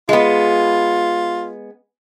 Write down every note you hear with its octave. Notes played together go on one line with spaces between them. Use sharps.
G#3 B3 F4